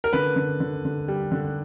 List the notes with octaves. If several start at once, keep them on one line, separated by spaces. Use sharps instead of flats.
A#4
D3 B4
D3
D3
D3
G3
D3